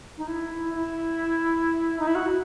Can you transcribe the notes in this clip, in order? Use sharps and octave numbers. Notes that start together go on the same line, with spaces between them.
D#4
E4
E4
D#4
E4
F#4